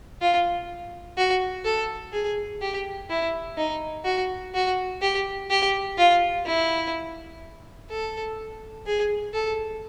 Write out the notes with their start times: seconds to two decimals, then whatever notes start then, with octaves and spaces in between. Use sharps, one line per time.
0.21 F4
1.18 F#4
1.65 A4
2.13 G#4
2.61 G4
3.10 E4
3.57 D#4
4.05 F#4
4.54 F#4
5.02 G4
5.50 G4
5.98 F4
6.46 E4
7.90 A4
8.86 G#4
9.34 A4